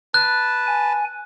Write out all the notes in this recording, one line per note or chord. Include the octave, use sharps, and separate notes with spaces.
B4 A5 F#6
G#5